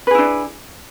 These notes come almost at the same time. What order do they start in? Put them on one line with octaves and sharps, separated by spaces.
B4 G#4 E4 D4